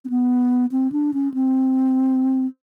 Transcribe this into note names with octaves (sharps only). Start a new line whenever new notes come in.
C4
B3
C4
D4
C#4
C4